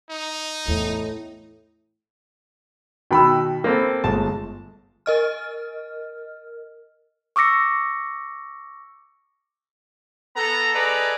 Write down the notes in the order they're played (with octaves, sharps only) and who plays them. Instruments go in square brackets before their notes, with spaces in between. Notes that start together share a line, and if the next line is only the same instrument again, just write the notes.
[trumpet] D#4
[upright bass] E2 [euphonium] A2
[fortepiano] B2 D#3 [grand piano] G5 B5 E6
[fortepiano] A#3 C4 A4
[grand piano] G1 G#3 A3 [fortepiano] A5
[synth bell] A#4 D#5 F6
[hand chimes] C#6 D6 E6 A#6 C#7
[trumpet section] B3 A4 A#5
G#4 A4 B4 D5 D#5 A#5